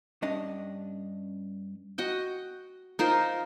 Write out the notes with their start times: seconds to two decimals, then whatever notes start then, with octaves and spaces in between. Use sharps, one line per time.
0.22 G2 C#4 D4 D#5
1.98 F#4 D#5 G5
2.99 D#4 F4 A#4 C5